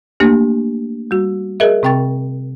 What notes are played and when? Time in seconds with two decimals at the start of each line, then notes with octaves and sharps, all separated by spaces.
0.20 A3 A#3 D4 G4
1.11 G3 F#4
1.60 G#4 A#4 D#5 E5
1.83 C3 C4 G5 C#6 A6